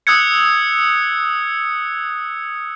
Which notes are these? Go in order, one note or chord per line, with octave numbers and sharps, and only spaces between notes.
D#6 E6 F#6 G#6 C#7